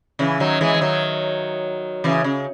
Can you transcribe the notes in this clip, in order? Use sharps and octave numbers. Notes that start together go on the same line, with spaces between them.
C#3 E3
D#3 F#3
E3 G#3
E3
D#3 F#3
C#3 E3
C#3